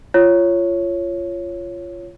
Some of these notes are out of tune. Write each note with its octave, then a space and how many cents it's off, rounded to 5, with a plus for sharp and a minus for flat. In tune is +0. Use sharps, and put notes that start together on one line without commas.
F4 -20 C#5 +0